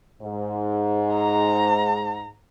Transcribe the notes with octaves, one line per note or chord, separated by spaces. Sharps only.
G#2
A#5